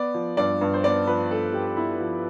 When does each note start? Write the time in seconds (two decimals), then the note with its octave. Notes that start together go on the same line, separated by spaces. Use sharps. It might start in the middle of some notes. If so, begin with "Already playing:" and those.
Already playing: B3 D5
0.14 F3
0.37 G2 D5
0.61 G2
0.74 C5
0.84 B3 D5
1.07 F3 B4
1.31 G2 A4
1.53 G2 G4
1.77 B3 E4
2.00 F3